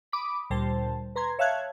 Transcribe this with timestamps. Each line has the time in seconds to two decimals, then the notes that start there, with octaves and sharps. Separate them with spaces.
0.12 B5 D6 D#6
0.50 D2 A#2 G3 C5 A5
1.16 B4 A#5 C6 G#6
1.39 C#5 E5 F5 A5 F#6 G#6